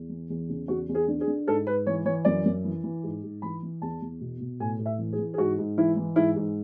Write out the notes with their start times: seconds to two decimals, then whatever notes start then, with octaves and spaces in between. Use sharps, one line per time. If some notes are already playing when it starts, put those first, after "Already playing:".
Already playing: E2
0.09 E3
0.30 E2
0.49 C#3
0.68 E2 F#4
0.89 E2
0.95 G#4
1.08 D3
1.21 G#4
1.27 D3
1.47 G#2 A4
1.67 G#2 B4
1.86 E3 C#5
2.05 E3 C#5
2.25 F#2 D5
2.45 F#2
2.65 E3
2.84 E3
3.04 G#2
3.23 G#2
3.42 E3 B5
3.63 E3
3.82 E2 A5
4.02 E2
4.21 B2
4.41 B2
4.60 A2 G#5
4.79 A2
4.86 E5
4.99 E3
5.12 G#4
5.19 E3
5.34 G#4
5.38 G#2 F#4
5.58 G#2
5.78 E3 E4
5.97 E3
6.16 G#2 E4
6.36 G#2